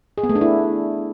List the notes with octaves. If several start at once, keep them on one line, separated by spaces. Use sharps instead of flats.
G#4
B3
A3
D4
E4